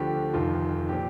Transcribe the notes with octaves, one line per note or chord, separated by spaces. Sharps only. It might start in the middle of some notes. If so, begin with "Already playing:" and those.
Already playing: D2 D3 F3 G4
F1 F2 D#3 F4
A#2 F3 G4